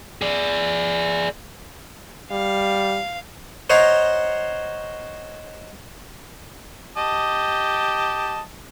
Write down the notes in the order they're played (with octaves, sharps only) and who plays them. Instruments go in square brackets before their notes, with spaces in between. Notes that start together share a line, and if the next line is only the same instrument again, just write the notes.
[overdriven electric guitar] G#4 D5
[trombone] G3 [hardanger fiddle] F5
[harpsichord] C5 C#5 D#5 F#5 A#5 C6
[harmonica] G4 D#5 A5